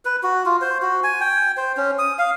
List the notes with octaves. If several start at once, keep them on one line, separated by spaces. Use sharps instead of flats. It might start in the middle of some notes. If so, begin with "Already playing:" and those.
B4
F#4
F4
C5
F#4
G#5
G5
C5
C#4
D#6
F5